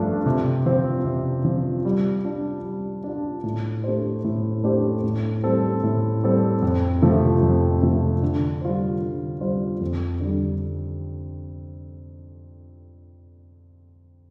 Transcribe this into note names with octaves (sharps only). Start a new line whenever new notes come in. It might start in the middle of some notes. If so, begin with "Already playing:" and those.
Already playing: G2 F3 A3 D4
C3
F3 C4
C3
F3 C4
G3
D4 F4
G3
D4 F4
A2
A3 D4 G4 C5
A2
A3 D4 G4 C5
A2
G3 C4 A4
A2
G3 C4 A4
F2
C3 F3 A3
F2
C3 F3 A3
D3
G3 F4 C5
D3
G3 F4 C5
F2
D3 G3